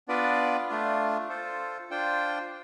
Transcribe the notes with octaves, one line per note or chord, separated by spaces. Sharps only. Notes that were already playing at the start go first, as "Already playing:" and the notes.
B3 D4 F4 B4 D5
A3 D4 F4
F4 A4 C5
D4 F4 C5 G5